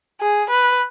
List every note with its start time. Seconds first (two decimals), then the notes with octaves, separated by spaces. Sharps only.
0.21 G#4
0.50 B4